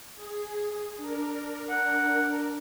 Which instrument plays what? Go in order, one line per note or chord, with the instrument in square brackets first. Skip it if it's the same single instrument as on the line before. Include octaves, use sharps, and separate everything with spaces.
[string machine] G#4
D4 A#4
[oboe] F#5